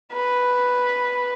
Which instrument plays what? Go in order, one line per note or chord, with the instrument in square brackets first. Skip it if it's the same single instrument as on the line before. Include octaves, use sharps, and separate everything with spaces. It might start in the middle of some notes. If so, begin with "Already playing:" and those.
[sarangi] B4